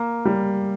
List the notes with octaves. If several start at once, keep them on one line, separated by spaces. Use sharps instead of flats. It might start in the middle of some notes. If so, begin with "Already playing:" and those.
Already playing: A#3
G3